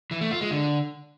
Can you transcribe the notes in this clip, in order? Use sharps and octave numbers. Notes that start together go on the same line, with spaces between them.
E3
A3
F4
G#3
D3